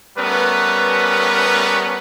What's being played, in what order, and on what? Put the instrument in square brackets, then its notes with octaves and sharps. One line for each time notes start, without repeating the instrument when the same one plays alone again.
[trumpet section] G3 A3 B3 C#4 A#4 B4